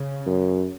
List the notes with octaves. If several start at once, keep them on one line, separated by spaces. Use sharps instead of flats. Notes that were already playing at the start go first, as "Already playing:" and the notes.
Already playing: C#3
F#2